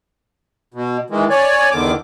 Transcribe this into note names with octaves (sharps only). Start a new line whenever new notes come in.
B2
D#3 E3 G#3
C#5 D5 G#5
E2 D3 D#3 D6